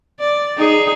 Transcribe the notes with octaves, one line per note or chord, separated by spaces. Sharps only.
D5
D#4 G#4